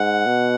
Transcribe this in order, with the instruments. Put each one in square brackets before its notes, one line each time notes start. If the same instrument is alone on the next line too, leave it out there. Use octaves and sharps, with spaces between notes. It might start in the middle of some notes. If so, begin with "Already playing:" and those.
Already playing: [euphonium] G#2 [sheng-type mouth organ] F#5
[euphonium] B2